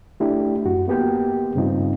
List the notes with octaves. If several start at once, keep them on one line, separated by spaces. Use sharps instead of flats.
A3 D4 E4 G4
F#2 F#4
A#3 B3 G4 G5
G2 C#3 G3 C4 D#4 F4